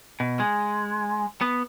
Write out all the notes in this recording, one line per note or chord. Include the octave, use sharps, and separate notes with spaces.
B2
G#3
B3